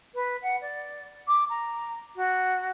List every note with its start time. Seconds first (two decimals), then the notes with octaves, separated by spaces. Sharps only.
0.14 B4
0.42 F#5
0.61 D5
1.27 D6
1.49 A#5
2.15 F#4